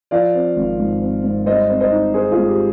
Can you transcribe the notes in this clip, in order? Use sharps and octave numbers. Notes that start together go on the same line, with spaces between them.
F3 D5 F5
C4
G#1
G#2
C4
G#2
G3 C5 D#5
C4
C5 D#5
D#4
D#4 G#4 C5
F4 G#4
G#2
G4